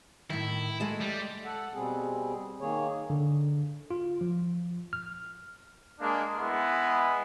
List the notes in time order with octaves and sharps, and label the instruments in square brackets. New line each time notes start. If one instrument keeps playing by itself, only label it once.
[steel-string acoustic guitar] A2 D#3 [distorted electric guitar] E4
[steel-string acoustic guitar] G#3 A3 D#5
[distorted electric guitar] G3
[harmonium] A4 F#5
B2 G3 C4 G#4
D#3 A#3 G#4 C#5
[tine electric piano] D3
F4
F3
F6
[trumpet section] G#3 A#3 D4
G#3 B3 E4